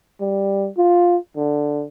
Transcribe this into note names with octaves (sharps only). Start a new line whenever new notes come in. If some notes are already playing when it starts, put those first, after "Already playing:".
G3
F4
D3